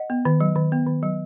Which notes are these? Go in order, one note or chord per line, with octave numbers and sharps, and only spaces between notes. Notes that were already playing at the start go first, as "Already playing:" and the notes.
Already playing: D#5 F#5
B3
D#3
F#3
D#3
B3
D#3
F#3